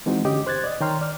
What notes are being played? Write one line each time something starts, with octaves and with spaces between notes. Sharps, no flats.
E3 G#3 C4 D#4 F#4
D3 C#4 G4 D#5 D6
C5 F#6 G#6 A6
D5 D#5
D#3 C#5 G5 A#5 C6 F6
D5 F6